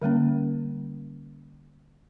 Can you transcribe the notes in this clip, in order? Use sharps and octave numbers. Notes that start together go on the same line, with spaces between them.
D3 G3 A#3 C#4